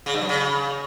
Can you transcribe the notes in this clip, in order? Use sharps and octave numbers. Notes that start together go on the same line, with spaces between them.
C#3
G2
F#2
C#3